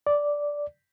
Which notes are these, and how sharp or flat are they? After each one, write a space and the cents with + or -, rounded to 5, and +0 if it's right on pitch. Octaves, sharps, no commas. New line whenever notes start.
D5 -5